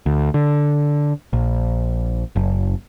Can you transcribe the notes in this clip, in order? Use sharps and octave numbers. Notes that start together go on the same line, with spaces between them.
D2
D3
A#1
F#1